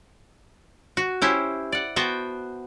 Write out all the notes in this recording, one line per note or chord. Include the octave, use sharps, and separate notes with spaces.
F#4
C#4 E4 G4 C5
D5 F#5
B3 F#4 C5 G5 A5